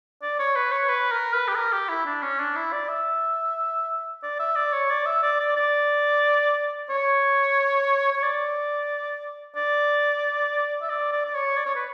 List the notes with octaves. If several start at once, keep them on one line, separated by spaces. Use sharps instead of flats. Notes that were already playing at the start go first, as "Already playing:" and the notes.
D5
C#5
B4
C#5
B4
A#4
B4
G4
A#4
G4
E4
D4
C#4
D4
E4
D5
E5
D5
E5
D5
C#5
D5
E5
D5
D5
D5
C#5
C#5
D5
D5
E5
D5
D5
D5
C#5
D5
C#5
B4